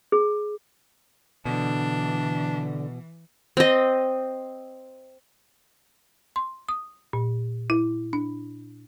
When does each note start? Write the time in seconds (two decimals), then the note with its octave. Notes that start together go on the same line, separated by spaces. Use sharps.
0.12 G#4
1.45 B2 D3 E3 D4
3.57 C4 D#5
6.36 C6
6.69 D#6
7.13 A#2
7.70 E4
8.13 D4